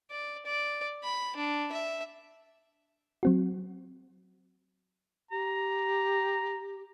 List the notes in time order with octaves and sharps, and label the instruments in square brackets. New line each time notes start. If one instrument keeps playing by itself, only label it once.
[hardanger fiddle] D5
D5
B5
D4
E5
[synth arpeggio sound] F#3 C4 F#4
[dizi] G4 [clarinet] A#5